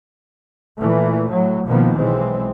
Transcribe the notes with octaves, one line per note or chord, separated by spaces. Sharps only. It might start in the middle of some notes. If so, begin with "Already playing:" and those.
A#2 E3 A3
A2 F#3
B2 D#3 F3 A#3 B3
B1 E3 G#3 C4